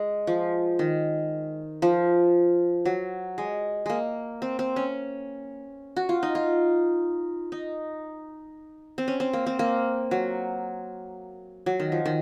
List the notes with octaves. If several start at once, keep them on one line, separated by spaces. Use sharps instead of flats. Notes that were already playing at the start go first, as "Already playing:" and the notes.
Already playing: G#3
F3
D#3
F3
F#3
G#3
G#3 A#3
C4
C4
C#4
F#4
F4
D#4
F4
D#4
C4
C#4
C4
A#3
C4
A#3
F#3
F#3
D#3
F3
D#3